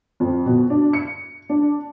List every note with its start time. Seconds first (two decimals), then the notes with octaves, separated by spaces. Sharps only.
0.20 F2
0.46 B2
0.70 D4
0.93 C#7
1.49 D4